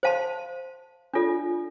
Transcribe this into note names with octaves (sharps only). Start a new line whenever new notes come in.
C5 F5 A5 C6
D4 F4 A4 D5